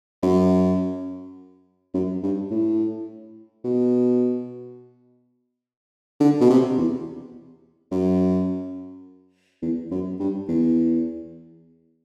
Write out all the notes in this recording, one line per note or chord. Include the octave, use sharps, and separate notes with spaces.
F#2
F#2
G2
A2
B2
D3
B2
C3
E2
F#2
E2
F#2
G2
E2